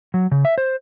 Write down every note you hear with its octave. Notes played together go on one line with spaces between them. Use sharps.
F#3
C#3
E5
C5